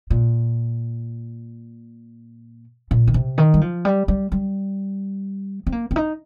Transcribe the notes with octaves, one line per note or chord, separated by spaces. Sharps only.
A#2
A#2
D#3
C3
D#3
G3
F3
G3
G3
G3
C4
A#3
C4
D#4